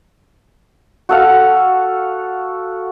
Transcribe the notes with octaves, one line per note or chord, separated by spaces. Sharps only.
F#4 A4 F5